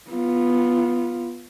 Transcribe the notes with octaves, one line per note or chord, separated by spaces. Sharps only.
B3 F4